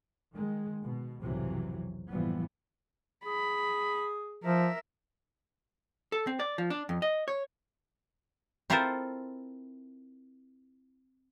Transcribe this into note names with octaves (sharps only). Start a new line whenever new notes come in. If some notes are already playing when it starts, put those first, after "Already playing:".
D#3 G#3
B2
B1 F2 G#2 C3 E3 F#3
F#1 A2 E3 F3 G3 B3
G#4 B5
F3 A#4 E5
A4
C4
D5
F3
D4
F2
D#5
C#5
C4 E4 F4 A4 A#4 C5